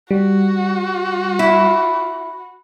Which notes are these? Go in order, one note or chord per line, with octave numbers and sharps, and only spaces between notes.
G3 F#4
E4